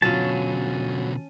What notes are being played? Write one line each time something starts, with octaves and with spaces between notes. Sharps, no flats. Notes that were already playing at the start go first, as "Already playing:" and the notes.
B2 D3 F#3 C#4 F4 A5